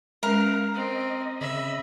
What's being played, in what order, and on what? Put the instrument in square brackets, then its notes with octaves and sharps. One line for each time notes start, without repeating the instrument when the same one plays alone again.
[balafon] G#3 C#4 [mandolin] A#4 [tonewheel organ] B4 F5 A#5
[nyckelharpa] C4 [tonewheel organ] D#5
[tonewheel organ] C#3 D#5 B5 [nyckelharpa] E5